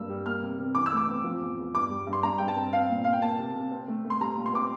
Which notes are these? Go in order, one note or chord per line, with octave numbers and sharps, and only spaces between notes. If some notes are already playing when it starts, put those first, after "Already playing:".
Already playing: G2 A#3 E6
G3
A#3 F6
C3
C3
E3 D6
E6
A3 D6
C4
F3
E2
E2
G2 D6
G3
G2
C6
G2 A#5
G2 G5
A5
C4
C4 F5
A#2
A#2 F5
G5
A#3 A5
C3
C3
C4
A3
A3
C6
G3 A#5
A#2
C6
C4 D6